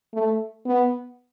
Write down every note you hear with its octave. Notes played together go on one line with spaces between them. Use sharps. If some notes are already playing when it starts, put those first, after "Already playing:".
A3
B3